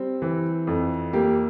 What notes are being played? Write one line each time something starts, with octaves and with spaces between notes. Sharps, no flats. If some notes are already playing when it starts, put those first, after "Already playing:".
Already playing: G3 C4
E3
F2
A#3 G4